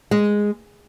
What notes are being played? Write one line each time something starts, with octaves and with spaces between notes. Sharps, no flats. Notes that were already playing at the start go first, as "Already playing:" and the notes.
G#3